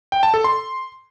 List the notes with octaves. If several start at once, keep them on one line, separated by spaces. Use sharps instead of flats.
G5
A5
A4
C6